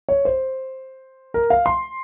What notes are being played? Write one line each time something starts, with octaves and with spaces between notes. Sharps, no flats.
C#5
C5
A#4
F5
C6